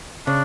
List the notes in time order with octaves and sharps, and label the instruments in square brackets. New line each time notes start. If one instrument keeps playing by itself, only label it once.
[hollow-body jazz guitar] C#3 [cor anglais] D4